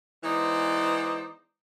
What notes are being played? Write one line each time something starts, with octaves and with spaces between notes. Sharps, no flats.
E3 G#3 B3 D#4 C5 D5